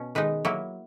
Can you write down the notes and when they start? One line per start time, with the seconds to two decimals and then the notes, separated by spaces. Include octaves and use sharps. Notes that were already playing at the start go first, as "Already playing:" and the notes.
Already playing: B2 C#4
0.15 D#3 G#3 D#4 B4
0.45 F#3 A#3 E4